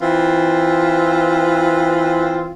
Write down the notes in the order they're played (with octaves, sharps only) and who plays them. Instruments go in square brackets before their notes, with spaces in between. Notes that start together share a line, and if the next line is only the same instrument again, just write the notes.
[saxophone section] E3 C4 F4